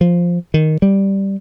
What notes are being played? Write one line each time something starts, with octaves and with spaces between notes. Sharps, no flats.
F3
D#3
G3